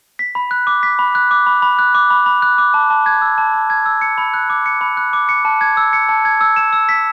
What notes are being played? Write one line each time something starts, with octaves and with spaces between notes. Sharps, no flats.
B6
B5
F#6
D6
B6
B5
F#6
D6
B5
B5
F#6
D6
B5
B5
F#6
D6
A5
A5
G#6
E6
A5
A5
G#6
E6
C#7
B5
F#6
D6
C#7
B5
F#6
D6
C#7
A5
G#6
E6
C#7
A5
G#6
E6
E7
E6
B6